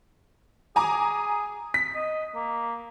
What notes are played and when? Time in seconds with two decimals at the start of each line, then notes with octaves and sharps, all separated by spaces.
0.76 G#4 G#5 A#5 D6
1.74 B6
1.95 D#5
2.35 A#3